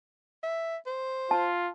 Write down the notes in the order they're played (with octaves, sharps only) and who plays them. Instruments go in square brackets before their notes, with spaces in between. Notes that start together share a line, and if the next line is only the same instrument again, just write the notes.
[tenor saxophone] E5
C5
[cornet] F4 [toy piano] A5